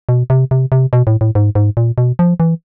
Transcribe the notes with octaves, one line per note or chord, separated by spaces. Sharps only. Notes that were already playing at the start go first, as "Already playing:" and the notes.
B2
C3
C3
C3
B2
A2
A2
G#2
G#2
A#2
B2
F3
E3